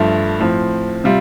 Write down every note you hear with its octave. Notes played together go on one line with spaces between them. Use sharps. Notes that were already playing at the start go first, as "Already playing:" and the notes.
Already playing: G2 F3 A3
A2 F3 C4
C3 G3 F4